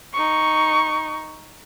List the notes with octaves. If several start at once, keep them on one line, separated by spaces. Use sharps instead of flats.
D#4 C#6